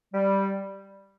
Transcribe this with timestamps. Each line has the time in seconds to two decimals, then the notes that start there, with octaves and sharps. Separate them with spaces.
0.13 G3